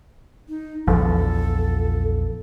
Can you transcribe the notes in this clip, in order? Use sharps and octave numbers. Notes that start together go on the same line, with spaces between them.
D#4
A#1 E2 F3 A4